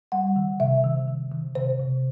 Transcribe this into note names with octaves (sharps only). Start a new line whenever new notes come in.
G3 F#5
D#3
C3 E5
D#3
D#3
D#3
C3 C5
C3